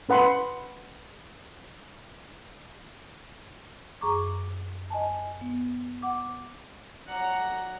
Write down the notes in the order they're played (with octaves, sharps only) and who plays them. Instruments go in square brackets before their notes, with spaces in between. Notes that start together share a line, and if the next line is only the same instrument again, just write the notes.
[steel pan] C#4 B4 F#5 B5 C6
[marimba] F#2 G#4 A#5 C#6 D6
D#5 G#5 A5
B3
F#5 D6
[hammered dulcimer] F#3 D5 [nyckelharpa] F#5 A#5